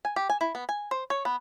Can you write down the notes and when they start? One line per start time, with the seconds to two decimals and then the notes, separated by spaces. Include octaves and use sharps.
0.05 G#5
0.16 G4
0.30 G#5
0.41 E4
0.55 B3
0.69 G#5
0.91 C5
1.10 C#5
1.25 B3